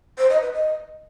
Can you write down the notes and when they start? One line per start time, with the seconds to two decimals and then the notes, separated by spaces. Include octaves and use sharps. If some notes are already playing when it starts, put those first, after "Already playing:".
0.18 C5
0.30 D#5
0.42 B4
0.53 D#5